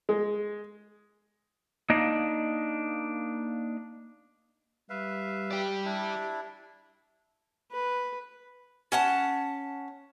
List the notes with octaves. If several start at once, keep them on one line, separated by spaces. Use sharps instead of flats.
G#3
A#3 D4 D#4 D#5 F5
G3 B4 E5 F5
G4 D5
D4 E4
B4
C#4 F#5 A5